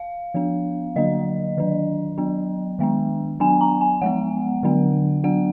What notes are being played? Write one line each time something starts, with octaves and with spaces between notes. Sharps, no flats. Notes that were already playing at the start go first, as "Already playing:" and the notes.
Already playing: F5
F3 B3 D4
D3 F#3 A#3 D4 D#5
D#3 F#3 D4
F#3 B3 D4
D#3 G#3 B3 D4
F#3 B3 D4 G#5
A#5
G#5
F3 G#3 B3 F#5
D3 F#3 B3 D4
F#3 B3 D4 F#5